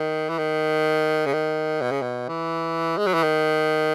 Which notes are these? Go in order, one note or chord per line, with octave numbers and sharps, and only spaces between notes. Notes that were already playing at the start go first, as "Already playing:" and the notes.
Already playing: D#3
E3
D#3
C#3
D#3
B2
C#3
B2
E3
G#3
F#3
E3
D#3